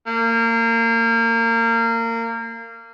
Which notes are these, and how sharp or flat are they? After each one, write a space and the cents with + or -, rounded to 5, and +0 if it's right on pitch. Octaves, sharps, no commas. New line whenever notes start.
A#3 -25